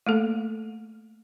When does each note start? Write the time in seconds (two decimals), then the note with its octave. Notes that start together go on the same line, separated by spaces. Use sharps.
0.06 A3 A#3 A4